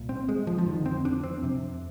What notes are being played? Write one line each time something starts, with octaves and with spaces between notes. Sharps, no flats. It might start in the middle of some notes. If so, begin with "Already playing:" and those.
Already playing: C2 A#2
C4
G#3
F3
F3
F2 D3 D#3
C4
D4
C4
F2 C3